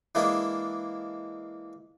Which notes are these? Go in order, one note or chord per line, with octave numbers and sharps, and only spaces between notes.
E3 G#3 A#3 D4 G#4